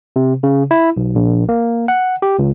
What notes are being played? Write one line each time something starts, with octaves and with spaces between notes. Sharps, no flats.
C3
C#3
E4
B1
A#1
A#3
F#5
G4
C#2